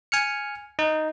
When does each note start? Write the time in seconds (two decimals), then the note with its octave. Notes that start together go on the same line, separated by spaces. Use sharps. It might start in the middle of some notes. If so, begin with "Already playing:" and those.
0.12 G#5 F6 C#7
0.79 D#4